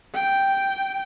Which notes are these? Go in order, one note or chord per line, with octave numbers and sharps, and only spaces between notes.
G5